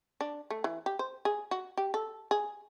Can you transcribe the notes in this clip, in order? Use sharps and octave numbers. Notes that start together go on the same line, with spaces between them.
D4
A3
E3
G4
C5
G#4
F#4
G4
A4
G#4